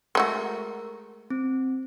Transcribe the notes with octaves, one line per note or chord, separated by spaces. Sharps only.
G#3 A3 F#4 A#4
C4